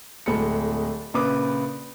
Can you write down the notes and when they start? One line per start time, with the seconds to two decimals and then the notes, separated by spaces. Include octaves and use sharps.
0.26 D1 G#3 A4 B5 C#7
1.14 A#1 C#3 B4 D6 D#6